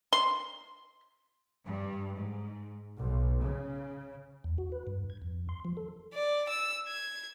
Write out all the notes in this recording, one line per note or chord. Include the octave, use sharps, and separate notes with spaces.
C6
G2
G#2
B1
C#3
E2
F#4
B4
G2
G#6
F2
C6
F3
A4
D5
E6
G#6